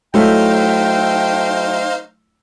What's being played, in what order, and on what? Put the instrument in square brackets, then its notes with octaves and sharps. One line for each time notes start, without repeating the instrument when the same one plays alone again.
[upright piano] F#3 A3 E4 [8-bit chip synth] D#4 C5 F5 [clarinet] G5